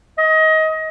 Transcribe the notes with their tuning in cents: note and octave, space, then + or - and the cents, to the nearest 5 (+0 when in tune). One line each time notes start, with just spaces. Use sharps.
D#5 +25